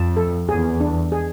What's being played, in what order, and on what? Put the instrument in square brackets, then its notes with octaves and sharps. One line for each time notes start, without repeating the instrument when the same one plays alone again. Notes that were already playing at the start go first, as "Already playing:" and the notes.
Already playing: [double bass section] F2 [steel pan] A5
[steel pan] A4
[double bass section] E2 [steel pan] G#4
[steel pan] D4
G#4